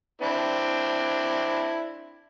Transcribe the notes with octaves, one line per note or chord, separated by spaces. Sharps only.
C4 D4 E4